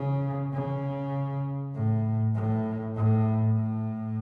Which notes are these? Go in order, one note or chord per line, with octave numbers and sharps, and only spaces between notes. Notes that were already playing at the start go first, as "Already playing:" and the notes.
Already playing: C#3
C#3
A2
A2
A2
A2